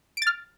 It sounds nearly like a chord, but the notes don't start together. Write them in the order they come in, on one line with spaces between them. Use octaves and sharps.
D7 A6 F6